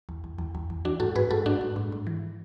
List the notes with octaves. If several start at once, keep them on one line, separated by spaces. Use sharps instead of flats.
E2
E2
E2
E2
E2
E3 D4 F#4
G#2 F#4 A4
G#2 G#4 B4
G#2 F#4 A4
G#2 D4 F#4
G#2
G#2
G#2
E3